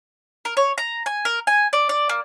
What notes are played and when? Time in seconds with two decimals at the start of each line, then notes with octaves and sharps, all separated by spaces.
0.45 A#4
0.57 C#5
0.78 A#5
1.06 G#5
1.25 A#4
1.47 G#5
1.73 D5
1.89 D5
2.09 A#3